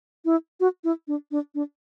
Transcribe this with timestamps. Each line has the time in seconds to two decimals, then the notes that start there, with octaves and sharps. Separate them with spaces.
0.25 E4
0.60 F#4
0.84 E4
1.08 D4
1.31 D4
1.55 D4